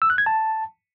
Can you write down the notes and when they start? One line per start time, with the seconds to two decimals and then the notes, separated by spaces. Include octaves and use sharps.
0.02 E6
0.10 F#6
0.18 G#6
0.26 A5